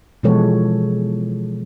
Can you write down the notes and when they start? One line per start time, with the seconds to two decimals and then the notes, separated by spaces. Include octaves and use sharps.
0.23 B2 E3 F3 G#3 A4 C#5